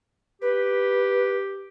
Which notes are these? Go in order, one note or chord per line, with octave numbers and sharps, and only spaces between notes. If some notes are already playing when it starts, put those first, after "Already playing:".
G4 B4